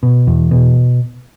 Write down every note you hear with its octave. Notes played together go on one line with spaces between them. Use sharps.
B2
E2
B2